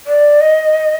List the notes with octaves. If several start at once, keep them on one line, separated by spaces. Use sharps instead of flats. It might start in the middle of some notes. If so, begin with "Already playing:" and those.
D5
D#5